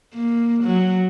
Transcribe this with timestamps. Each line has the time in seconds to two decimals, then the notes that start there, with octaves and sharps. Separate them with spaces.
0.14 A#3
0.63 F#3